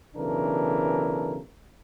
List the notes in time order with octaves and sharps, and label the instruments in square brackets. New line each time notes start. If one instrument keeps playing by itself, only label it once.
[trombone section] B1 C#3 E3 D4 A4 A#4